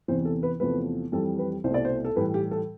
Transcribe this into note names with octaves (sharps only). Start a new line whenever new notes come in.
E2 C3 E3 C5
A4
B4
E2 C3 F3 A3 B4
F2 E3 G3 A4
B4
C2 B2 A3 C5
D5
C5
A4
A2 E3 G3 B4
G4
A4